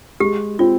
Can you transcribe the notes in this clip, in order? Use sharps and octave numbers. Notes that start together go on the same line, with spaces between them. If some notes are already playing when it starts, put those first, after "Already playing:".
G#3 G4
C4 F4